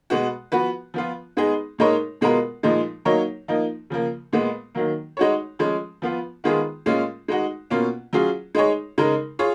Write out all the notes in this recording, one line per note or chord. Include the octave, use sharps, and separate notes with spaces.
B2 G#3 B3 F#4
F3 B3 F#4 B4
F3 B3 F4
G#3 B3 D#4 G#4
A#2 G#3 D#4 A#4 C#5
B2 G#3 B3 F4 A#4
A#2 F3 G#3 D#4
F#3 A#3 D#4 A#4 C#5
F3 A#3 D#4
C#3 F3 A#3
A#2 G#3 B3
D#3 F#3 A#3
G#3 D#4 F#4 C#5
F3 G#3 C#4
F3 B3 F4
D#3 G#3 B3 F4 G#4
A#2 G#3 C#4 F4
G#3 D#4 F#4
B2 A#3 C#4 F4
F#3 C#4 F4 G#4
G#3 D#4 G#4 C#5
C#3 G#3 D#4 A#4
F4 G#4 C#5